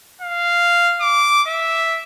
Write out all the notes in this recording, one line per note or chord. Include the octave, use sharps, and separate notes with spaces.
F5
D6
E5